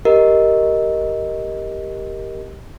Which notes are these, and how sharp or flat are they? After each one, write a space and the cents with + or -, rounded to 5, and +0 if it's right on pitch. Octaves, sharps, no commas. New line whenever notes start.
G4 +0 A#4 +0 D#5 +10